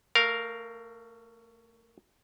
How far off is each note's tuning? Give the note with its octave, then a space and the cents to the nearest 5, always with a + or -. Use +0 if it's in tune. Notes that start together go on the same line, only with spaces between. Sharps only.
A3 +25 A#4 +0 F5 +0